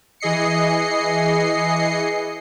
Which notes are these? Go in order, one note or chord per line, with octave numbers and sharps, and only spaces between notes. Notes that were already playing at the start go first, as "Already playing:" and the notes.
E3 G#4 D#5 C7 C#7